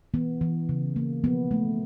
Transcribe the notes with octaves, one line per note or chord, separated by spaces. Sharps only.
E3 B3
E3
C#3
A#3
F3 B3
A3